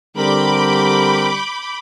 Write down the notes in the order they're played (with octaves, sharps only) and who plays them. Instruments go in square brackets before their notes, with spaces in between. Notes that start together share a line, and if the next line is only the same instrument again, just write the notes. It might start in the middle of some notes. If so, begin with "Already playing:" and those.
[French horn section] D3 G3 [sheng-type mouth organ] C4 A#4 [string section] B5 D6 G6